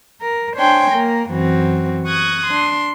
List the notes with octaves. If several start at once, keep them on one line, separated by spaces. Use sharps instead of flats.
A#4
D4 C5 C#5 G5 G#5 C6
A#3 A#4
F#2 E3 C4 F#4
C#6 D#6 F#6 G#6 A#6
D4 C6